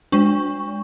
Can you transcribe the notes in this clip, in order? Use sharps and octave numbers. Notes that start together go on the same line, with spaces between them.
G#3 D4 C#6